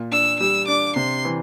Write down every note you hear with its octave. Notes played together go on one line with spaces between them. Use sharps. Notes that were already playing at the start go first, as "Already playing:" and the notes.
Already playing: A#2
D4 E6
G3 E6
D4 D6
C3 C6
E3